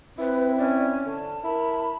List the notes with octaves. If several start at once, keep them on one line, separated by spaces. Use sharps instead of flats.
C4 E4 B4
C#4 D5
D3 A5
E4 A#4 B5